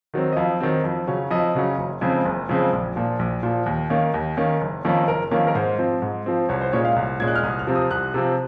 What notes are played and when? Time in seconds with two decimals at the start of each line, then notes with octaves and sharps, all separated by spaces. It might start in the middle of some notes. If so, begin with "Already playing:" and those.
0.14 D#3 F#3 C4
0.32 D#5
0.36 F2 F5
0.60 D#3 F#3 C4
0.84 F2
1.08 C#3 F#3 C#4
1.31 F2 D#5
1.55 C#3 F#3 C#4
1.78 F#1
2.01 F2 C#3 G#3 C4
2.26 F#1
2.49 F2 C#3 G#3 C4
2.73 A#1
2.96 A#2 F3
3.19 A#1
3.43 A#2 F3
3.66 D#2
3.90 D#3 A#3 C#4
4.14 D#2
4.37 D#3 A#3 C#4
4.61 F#1
4.85 F2 D#3 A#3 C#4
5.08 F#1 A#4
5.31 F2 D#3 A#3 C#4
5.47 A#4
5.55 G#2 C5
5.79 F3 C4
6.02 G#2
6.26 F3 C4
6.49 C2 C#5
6.61 C5
6.73 A#2 G#3 C#4 C#5
6.85 F5
6.96 C2
7.20 A#2 G#3 C#4 G#6
7.27 F#6
7.36 F6
7.43 C2 D#6
7.59 F6
7.67 C3 F3 C4
7.75 D#6
7.90 C2 F#6
8.14 C3 F3 C4